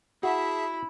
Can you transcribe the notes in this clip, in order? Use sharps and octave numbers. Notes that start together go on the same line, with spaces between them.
E4 F#4 G#4 E5 A5